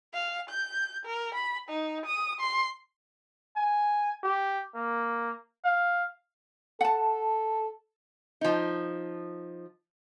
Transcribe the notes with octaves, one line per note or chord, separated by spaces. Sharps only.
F5
G6
A#4
B5
D#4
D#6
C6
G#5
G4
A#3
F5
A4 F#5 A5
F3 D#4